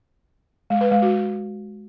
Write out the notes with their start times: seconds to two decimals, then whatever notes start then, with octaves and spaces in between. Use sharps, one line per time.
0.70 G#3
0.81 B4
0.92 G#3
1.02 F#4